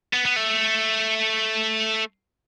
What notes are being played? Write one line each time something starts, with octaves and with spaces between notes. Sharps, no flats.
B3
B3
A3